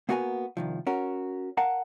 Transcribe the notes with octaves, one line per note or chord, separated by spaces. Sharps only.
A#3 B3 F#4 A#4 F#5 G#5
C2 D#3 F3
C#4 F#4 A#4
A#4 F5 F#5 A5 A#5